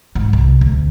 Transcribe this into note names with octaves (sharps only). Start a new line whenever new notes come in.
G#2
C2
D2